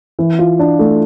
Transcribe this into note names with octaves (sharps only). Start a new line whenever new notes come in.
E3
F4
D4
A3